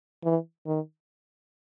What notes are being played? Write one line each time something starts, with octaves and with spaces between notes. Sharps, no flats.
E3
D#3